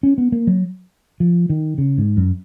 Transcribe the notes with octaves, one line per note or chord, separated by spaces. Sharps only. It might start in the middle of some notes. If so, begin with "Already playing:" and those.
C#4
B3
A#3
F#3
F3
D#3
C#3
G#2
F#2